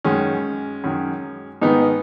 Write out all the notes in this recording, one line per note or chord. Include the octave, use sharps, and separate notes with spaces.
F#2 D#3 G#3 C#4
F#2 D#3
G#2 D#3 B3 D#4